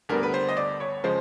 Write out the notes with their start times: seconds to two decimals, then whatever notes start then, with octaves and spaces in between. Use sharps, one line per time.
0.09 D2 D3 G3 B3 A#4
0.23 B4
0.34 C5
0.49 D#5
0.57 D5
0.80 C#5
1.04 C#3 F3 G#3 C5